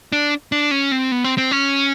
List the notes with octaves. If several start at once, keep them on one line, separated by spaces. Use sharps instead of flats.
D4
D4
C#4
C4
B3
C4
C4
C#4